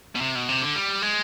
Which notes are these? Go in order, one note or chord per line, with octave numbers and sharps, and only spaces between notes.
B2
C3
B2
C3
D3
G3
G#3